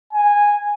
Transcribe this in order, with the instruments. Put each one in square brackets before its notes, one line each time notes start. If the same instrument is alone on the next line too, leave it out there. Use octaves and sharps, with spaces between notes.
[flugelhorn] G#5